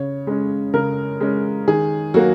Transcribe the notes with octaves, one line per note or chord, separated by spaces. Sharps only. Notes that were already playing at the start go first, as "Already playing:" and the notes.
Already playing: C#3 C#5
G#3 C#4
C#3 A#4
G#3 C#4
D#3 G#4
F#3 A#3 F#4